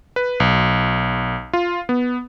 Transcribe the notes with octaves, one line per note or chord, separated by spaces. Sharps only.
B4
B1
F4
B3